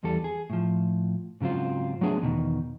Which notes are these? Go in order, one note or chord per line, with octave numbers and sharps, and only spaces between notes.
E2 E3 G3 A4
G#4
A2 F3
G#2 C#3 F#3 C4 F4
F#3 A3 B3 D4 G#4
E2 B2 D#3